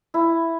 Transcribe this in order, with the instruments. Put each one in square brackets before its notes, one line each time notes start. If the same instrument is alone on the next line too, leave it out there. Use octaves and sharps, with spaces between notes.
[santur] E4